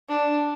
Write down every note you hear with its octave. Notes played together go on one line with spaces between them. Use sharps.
D4